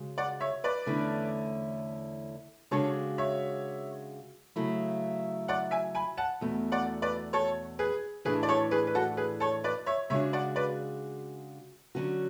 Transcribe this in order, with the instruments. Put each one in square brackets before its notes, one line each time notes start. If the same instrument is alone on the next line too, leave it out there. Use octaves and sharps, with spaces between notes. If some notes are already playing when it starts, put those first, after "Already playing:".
Already playing: [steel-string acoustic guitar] C#3 G#3 F#4
[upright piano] D5 F#5
C#5 E5
B4 D5
[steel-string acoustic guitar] E2 D3 A3 C#4 E4
[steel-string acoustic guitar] C#3 G#3 D4 F#4 [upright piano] A4 C#5
[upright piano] C#5 E5
[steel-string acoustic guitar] C#3 F#3 A3 E4
[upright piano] D5 F#5
E5 G#5
G#5 B5
F#5 A5
[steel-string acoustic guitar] E2 B2 A3
[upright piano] D5 F#5
B4 D5
A4 C#5
G#4 B4
[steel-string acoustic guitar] A2 E3 A3 D4 [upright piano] G#4 B4
[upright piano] D5
A4 C#5
G#4 B4
B4
F#4 A4
G#4 B4
A4 C#5
B4 D5
C#5 E5
[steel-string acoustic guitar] C#3 G#3 D4 F#4 [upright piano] C#5 E5
[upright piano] D5 F#5
B4 D5
[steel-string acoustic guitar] D3 F#3 C#4 F#4